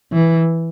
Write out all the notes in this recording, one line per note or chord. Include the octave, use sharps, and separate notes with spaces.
E3